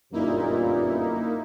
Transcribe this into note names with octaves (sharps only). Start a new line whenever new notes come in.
G1 F#2 A#2 A#3 D#4 E4